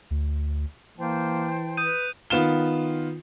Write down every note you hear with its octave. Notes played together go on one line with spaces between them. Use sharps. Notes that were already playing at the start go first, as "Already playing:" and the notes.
D2
E3 A#3 C5 G5 A5
B4 D#6 G6 D#7
D#3 B3 F4 E7 G7